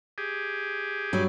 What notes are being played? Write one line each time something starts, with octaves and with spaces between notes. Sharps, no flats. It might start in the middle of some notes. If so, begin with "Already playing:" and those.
G4 G#4
G2 F#3